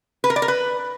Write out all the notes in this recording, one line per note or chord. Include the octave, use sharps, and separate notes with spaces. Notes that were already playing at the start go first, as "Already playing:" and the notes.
B4
A#4
D5
A#4
B4